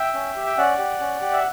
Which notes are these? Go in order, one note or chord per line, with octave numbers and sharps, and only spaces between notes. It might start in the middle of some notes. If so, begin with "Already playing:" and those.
Already playing: E5 G5
C#4
G4
G5
C#4 D5 F#5
G4
C#4
G4
E5